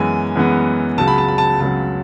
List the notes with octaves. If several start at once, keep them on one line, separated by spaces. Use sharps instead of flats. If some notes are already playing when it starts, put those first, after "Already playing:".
Already playing: F#2 E3 G#3 B3 G#5
F#2 E3 G#3 B3
C#2 C#3 F#3 A5
B5
A5
B5
A5
C#2 C#3 F#3 A5